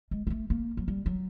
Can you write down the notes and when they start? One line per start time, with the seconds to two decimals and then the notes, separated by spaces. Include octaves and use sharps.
0.11 G#3
0.27 A#3
0.30 A3
0.50 A#3
0.77 F#3
0.88 G3
1.06 F#3